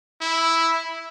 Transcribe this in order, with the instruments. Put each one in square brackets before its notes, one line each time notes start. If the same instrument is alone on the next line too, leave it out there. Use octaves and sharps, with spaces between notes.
[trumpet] E4